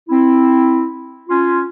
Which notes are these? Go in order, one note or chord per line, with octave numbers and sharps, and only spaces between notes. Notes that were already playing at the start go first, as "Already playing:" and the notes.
C4 E4
C#4 F4